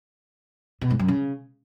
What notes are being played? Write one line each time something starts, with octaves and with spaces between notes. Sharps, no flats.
B2
G#2
F#2
C#3